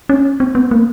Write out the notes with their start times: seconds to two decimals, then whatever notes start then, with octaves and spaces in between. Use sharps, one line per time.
0.09 C#4
0.40 C4
0.55 B3
0.71 A#3